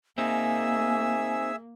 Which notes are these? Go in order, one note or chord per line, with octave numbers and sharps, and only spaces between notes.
A#3 C4 D#4 G#4 E5 G#5 E6